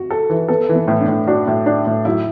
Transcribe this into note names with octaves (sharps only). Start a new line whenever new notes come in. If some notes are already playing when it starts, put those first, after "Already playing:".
Already playing: F#4
A4
E3
B3 A4
E3
B3
A2
D4
A2
D4 F#4
A2
D4
A2
F#3 E4